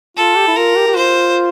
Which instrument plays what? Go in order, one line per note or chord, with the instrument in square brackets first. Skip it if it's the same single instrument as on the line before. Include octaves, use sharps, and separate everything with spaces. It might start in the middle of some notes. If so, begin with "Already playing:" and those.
[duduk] F4 [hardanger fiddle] A4
[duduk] G4
E4
[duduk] F4 [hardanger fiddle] A#4
[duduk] G4
G4
[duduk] F4 [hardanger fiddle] C5